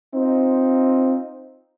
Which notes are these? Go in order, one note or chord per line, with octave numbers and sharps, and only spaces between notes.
C4 D#4 F4 C5